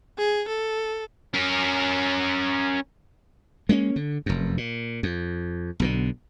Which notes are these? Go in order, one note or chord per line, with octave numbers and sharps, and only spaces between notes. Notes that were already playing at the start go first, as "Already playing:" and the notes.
G#4
A4
C#4 A#4
G#3 A#3 C4 C#4
D3
F1 F#2
A#2
F2
B1 B2 D3